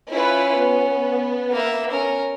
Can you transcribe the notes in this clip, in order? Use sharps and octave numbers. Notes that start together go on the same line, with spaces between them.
C#4 E4 F4 B4
B3
A#3 E5
C#4 A#4